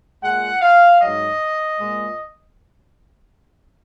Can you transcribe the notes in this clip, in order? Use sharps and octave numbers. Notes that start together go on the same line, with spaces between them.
A#2 G#3 F#5
F5
G#2 F#3 D#5
A#2 G#3